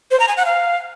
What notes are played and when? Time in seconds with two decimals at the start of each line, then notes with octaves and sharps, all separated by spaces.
0.11 C5
0.20 A#5
0.28 G#5
0.37 F#5
0.46 F5